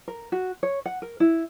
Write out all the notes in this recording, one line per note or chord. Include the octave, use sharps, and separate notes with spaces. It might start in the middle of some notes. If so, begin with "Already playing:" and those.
A#4
F#4
C#5
F#5
A#4
E4